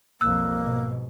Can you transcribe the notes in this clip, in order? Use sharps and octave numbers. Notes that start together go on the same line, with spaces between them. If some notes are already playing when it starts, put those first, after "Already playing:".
B1 F2 G3 A#3 E6 F#6
G#2 B2